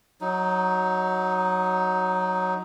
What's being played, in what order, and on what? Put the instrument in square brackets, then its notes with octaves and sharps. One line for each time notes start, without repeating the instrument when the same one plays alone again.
[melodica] F#3 D#4